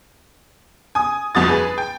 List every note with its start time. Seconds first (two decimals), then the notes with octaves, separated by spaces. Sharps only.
0.95 G#5 D#6
1.35 G1 F2 F#4 D#6 A6
1.49 G#4 B4
1.78 G5